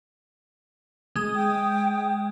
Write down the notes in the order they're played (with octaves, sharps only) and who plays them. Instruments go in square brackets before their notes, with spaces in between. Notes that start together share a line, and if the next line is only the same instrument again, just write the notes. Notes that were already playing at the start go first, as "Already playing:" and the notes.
[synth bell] G#3 D#6
[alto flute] G5